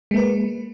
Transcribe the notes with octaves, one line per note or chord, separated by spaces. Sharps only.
G#3 A#3 B4